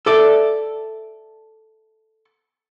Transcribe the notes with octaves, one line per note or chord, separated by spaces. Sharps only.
A4 D5 E5